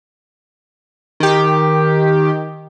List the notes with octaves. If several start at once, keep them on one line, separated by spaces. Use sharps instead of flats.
D#3 G4